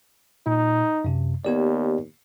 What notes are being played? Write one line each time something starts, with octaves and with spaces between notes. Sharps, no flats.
A#2 D#4
F#2 C3
D#2 B3 G4 D5